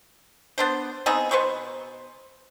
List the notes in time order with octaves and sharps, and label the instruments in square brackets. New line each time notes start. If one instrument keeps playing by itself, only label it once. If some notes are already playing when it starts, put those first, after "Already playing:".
[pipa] B3 D4 C5
B3 C4 D#4 G#4
B2 B4 C5 C#6